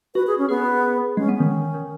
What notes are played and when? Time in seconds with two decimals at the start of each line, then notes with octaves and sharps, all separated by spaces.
0.15 F#4 B4
0.27 G#4
0.38 C#4
0.49 B3 G#4
1.17 G#3 C#4
1.29 B3
1.34 C#4
1.40 D#3
1.51 D#3
1.74 D#3